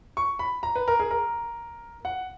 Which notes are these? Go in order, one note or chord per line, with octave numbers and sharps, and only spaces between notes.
C#6
B5
A#5
B4
A#4
G#4
A#4
F#5